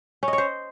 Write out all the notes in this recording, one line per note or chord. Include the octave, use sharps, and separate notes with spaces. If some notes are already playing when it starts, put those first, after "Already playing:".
C#4
D#5
C#5
C5